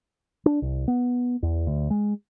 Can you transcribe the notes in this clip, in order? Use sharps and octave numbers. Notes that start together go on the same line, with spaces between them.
D4
C2
B3
E2
D2
G#3